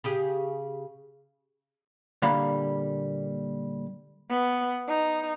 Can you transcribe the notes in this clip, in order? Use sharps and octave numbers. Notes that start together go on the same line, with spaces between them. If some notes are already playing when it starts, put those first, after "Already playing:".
C#3 G4 G#4
A#2 D3 G3 A#3 F5 B5
B3
D#4